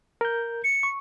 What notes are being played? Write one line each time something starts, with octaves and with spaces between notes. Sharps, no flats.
A#4 G6
C#7
C#6